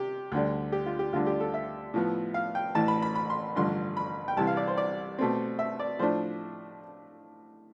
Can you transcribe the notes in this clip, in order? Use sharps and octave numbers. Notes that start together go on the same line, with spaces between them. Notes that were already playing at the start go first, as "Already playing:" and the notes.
Already playing: C3 G4
D2 D3 G3
G4
F4
G4
D2 D3 G3 D4 F4
G4
A4
E5
A2 F3 B3
F5
G5
A1 A2 E3 A5
B5
B5
B5
C6
A1 G2 D3 F3 C6
B5
G5
C2 C3 E3 A5
F5
D5
C5
D5
B2 A3 C4
E5
D5
A2 F3 A3 D4 C5